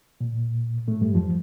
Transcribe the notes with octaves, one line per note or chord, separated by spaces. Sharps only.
A#2
A2 A3
G2 G3
F2 F3